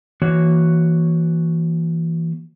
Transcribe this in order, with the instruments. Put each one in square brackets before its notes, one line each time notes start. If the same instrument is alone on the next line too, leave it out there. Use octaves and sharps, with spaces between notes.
[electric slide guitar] E3 A#3 F#4 C#5